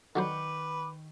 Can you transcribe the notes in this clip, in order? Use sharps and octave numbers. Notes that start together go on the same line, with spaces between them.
D3 D#3 F#3 B4 C5 G5 C#6 D6